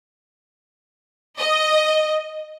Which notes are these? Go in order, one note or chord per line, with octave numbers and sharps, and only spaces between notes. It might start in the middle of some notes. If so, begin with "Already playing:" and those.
D#5